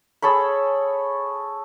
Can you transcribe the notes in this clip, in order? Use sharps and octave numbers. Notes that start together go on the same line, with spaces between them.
G#4 A4 C#5 B5